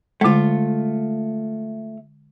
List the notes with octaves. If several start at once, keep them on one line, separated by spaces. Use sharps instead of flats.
D3 G#3 A3 F4